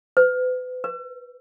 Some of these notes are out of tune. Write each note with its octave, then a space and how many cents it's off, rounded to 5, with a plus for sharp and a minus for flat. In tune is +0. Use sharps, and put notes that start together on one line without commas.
B4 +35
B4 -25